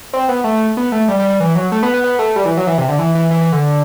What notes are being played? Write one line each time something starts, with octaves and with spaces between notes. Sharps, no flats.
C4
B3
A3
B3
A3
G3
G3
G3
E3
F#3
A3
B3
B3
B3
A3
G3
E3
F#3
E3
C3
D3
E3
E3
E3
E3
D3